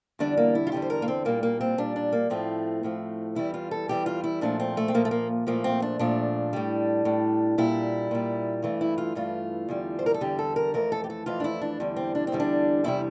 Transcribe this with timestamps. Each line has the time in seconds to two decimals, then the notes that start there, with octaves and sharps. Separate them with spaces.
0.19 E2 D3 G3 D4
0.37 A#3
0.55 E4
0.67 F4
0.72 E2 D3 G3 G4
0.82 C5
0.90 A#4
1.02 A#3
1.08 C4
1.25 A#2 G3 A#3
1.43 A#3
1.61 C4
1.78 A#2 G3 D4
1.96 D4
2.12 A#3
2.30 A2 F3 A3 C4
2.83 A2 F3 A3
3.35 E2 E3 G3 E4
3.54 F4
3.71 A4
3.88 E2 E3 G3 G4
4.06 F4
4.24 E4
4.41 A#2 F3 A3 D4
4.60 C4
4.77 A3
4.88 C4
4.94 A#2 F3 A3 A#3
5.05 A3
5.11 A#3
5.47 A#2 F3 A3 A#3
5.64 C4
5.82 D4
5.99 A#2 F3 A3 D4
6.53 A2 G3
7.05 A2 G3
7.58 A#2 G3 E4
8.11 A#2 G3
8.63 G2 E3 A3
8.81 E4
8.98 F4
9.15 G2 E3 A3 F4
9.69 E2 D3 G3
9.99 C5
10.06 A#4
10.14 A4
10.21 E2 D3 G3 G4
10.39 A4
10.56 A#4
10.74 F2 E3 A3 A#4
10.92 A4
11.04 G4
11.10 A4
11.26 F2 E3 A3 F4
11.40 D4
11.44 E4
11.61 D4
11.80 E2 D3 G3
11.96 C4
12.15 D4
12.27 C4
12.32 E2 D3 G3
12.40 D4
12.84 E2 C3 G3 E4